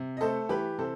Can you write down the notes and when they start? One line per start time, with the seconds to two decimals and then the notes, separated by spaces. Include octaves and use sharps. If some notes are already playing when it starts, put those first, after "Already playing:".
Already playing: C3
0.17 D#5
0.21 A3 A4 C5
0.49 E3 G4 B4
0.78 C3 A4 C5